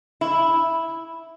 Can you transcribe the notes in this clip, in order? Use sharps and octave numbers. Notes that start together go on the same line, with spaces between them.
E4